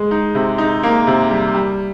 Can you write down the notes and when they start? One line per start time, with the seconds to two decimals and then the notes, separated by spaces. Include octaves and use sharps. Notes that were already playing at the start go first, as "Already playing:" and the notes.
Already playing: G#3
0.11 D#4
0.35 C3
0.58 D#4
0.83 A#3
1.07 C3
1.31 G3
1.55 G3